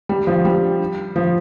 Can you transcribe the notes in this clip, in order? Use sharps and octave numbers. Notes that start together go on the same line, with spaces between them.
G3
F3
G3
F3